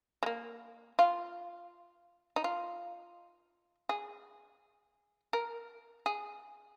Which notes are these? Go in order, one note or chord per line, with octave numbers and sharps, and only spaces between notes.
G#3
A#3
F4
D#4
F4
G#4
A#4
G#4